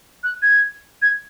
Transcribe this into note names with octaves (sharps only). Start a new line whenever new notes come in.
F#6
G#6
G#6